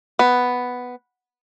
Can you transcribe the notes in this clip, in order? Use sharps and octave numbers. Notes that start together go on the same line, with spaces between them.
B3